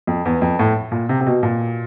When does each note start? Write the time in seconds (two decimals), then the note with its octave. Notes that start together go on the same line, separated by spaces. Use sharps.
0.07 F2
0.25 E2
0.42 F2
0.59 A2
0.92 A#2
1.09 C3
1.21 C3
1.27 B2
1.43 A#2